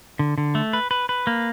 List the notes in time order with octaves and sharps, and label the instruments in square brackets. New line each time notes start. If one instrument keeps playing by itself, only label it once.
[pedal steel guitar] D3
D3
A3
B4
B4
B4
A#3